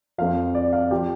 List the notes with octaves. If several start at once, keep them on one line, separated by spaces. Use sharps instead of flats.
F2 F3 F5
D5
F5
F3 G4 G5